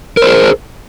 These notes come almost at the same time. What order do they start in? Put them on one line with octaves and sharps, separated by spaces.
A#4 C5 G#4